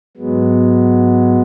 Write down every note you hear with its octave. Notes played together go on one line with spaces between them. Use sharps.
G#2 F#3 G#3 B3